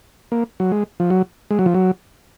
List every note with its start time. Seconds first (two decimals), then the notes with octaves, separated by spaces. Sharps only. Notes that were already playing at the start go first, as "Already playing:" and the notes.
0.32 A#3
0.60 F#3
0.72 G#3
1.00 F3
1.10 F#3
1.51 G#3
1.59 F#3
1.66 F3
1.74 F#3